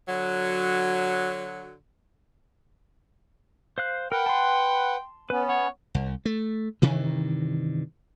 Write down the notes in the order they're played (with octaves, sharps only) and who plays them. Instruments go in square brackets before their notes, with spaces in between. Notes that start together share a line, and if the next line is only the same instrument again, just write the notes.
[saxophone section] D3 F#3
[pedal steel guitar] C5 F5 F#6
[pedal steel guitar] A#4 [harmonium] B4 F#5 [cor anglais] G5
[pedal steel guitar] A5 C6
[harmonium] B3 C#4 [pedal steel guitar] B4
[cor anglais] C#5 [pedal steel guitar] F#5
[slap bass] C2
A3
G2 C3 D#3 E3